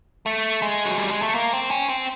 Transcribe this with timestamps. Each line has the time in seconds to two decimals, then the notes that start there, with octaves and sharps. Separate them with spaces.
0.26 A3
0.62 G#3
0.85 F#3
0.98 G3
1.10 G#3
1.22 A3
1.35 A#3
1.53 C4
1.71 C#4
1.89 C4